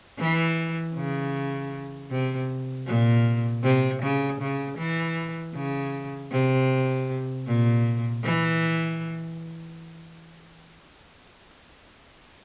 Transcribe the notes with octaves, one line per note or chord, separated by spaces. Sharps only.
E3
C#3
C3
A#2
C3
C#3
C#3
E3
C#3
C3
A#2
E3